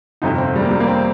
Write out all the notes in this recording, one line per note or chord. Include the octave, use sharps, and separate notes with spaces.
G1 F2 C3 D#4
C4
G3
A#3
G3
A#3
C4